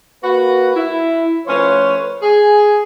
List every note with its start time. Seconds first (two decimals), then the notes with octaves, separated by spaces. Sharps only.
0.24 A#3 F#4 B4
0.76 E4
1.47 F3 A3 C#4 F4 B4 C#5
2.22 G#4